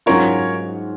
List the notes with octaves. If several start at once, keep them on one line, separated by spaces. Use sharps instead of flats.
G#2 F#3 C#4 F4 A#4 C#5